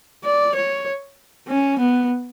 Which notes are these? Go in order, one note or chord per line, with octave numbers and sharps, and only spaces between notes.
D5
C#5
C#4
B3